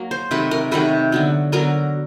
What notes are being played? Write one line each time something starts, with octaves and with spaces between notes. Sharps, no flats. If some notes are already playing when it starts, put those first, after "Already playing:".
Already playing: F#3 A#3
C5
C3 D#3 F#3 A3 B4
A#4
C3 D#3 F#3 A3 B4
D3 F#3 B3
D3 F#3 B3 A#4